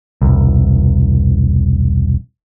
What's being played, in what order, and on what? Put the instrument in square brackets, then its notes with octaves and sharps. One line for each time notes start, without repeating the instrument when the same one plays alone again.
[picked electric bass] E1 C2